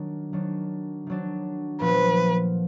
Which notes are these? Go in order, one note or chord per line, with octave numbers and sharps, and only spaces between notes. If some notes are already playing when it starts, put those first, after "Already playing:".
Already playing: D#3 F#3 D4
D#3 F#3 D4
D#3 F#3 D4
A#2 F3 B3 B4